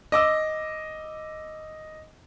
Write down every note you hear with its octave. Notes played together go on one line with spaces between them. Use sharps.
D#5 D6 E6